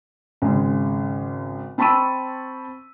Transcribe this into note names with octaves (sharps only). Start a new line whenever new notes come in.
G#1 C#3 G#3
C4 A5 B5 C#6 E6 D#7